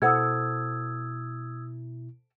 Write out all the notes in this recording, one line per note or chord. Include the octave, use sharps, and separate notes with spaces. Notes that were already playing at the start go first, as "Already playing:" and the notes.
B2 E4 A4 C5 F#5 D#6 E6 G#6